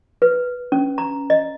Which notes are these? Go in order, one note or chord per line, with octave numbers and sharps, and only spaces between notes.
B4
C#4
A#5
D#5